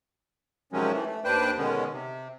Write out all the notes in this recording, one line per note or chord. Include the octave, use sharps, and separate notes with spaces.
C3 D#3 F3 F#3 G#3 C#4
E3 A3
A3
D#2 D4 B4 C5 G5 F#6
B2 D3 D#3 G#3 B3 C#4
C3